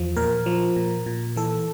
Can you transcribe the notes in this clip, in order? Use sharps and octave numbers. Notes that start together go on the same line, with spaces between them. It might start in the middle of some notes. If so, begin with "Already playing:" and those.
Already playing: E2 F3
A#2 A#4
F3
A#2
A#2
E3 A4